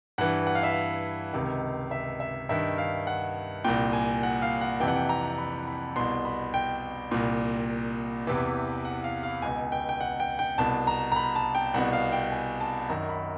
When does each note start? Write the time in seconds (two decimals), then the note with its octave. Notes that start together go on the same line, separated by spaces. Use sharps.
0.18 G2 E3 F#5
0.47 F#5
0.55 F5
0.63 E5
0.71 F5
1.33 C#2 C3 D#3
1.91 E5
2.20 E5
2.49 G2 D#3 E5
2.78 F5
3.07 F#5
3.64 C2 A#2 G5
3.93 G#5
4.23 F#5
4.42 F5
4.61 F#5
4.80 F2 C3 E3 G5
4.88 F#5
4.96 G5
5.09 A#5
5.38 B5
5.67 B5
5.96 C2 B2 C6
6.25 B5
6.54 G5
7.11 C2 A#2
8.27 E2 C3 E3
8.85 F#5
9.04 F5
9.23 F5
9.42 C#2 B2 G#5
9.72 G5
9.89 G5
10.01 F#5
10.20 G5
10.39 G5
10.58 C2 B2 A5
10.87 A#5
11.12 A#5
11.16 B5
11.35 A5
11.55 G5
11.74 C2 B2 F#5
11.93 F5
12.12 G5
12.32 G#5
12.61 A5
12.89 F#2 D#3 A#5
13.09 B5